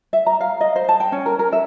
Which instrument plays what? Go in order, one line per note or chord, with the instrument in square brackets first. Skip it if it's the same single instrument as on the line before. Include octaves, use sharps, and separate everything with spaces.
[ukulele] E5
A#5
F5
D#5
C5
A5
G5
C#4
A#4
A#4
E5